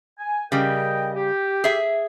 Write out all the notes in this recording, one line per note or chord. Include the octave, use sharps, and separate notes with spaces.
G#5
C#3 G3 A#4 D#5 G5
G4
G#4 E5